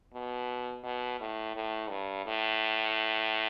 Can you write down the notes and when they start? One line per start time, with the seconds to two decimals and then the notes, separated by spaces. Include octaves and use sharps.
0.14 B2
0.83 B2
1.20 A2
1.55 A2
1.89 G2
2.26 A2